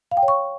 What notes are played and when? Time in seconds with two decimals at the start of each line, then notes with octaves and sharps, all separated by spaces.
0.11 F5
0.17 G5
0.23 C#5
0.28 C#6